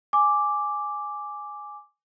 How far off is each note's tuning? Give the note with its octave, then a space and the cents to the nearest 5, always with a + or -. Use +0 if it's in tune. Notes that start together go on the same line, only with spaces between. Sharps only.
G#5 +0 D6 +0